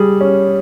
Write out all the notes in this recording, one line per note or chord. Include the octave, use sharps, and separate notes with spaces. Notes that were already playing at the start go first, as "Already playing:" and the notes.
Already playing: G3 G#4
C#4